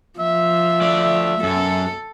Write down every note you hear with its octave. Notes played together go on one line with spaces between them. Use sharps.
F3 E5
A3 D5
F#2 A4